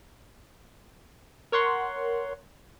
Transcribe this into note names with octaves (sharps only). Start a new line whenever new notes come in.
A#4 C#5 F#5 C6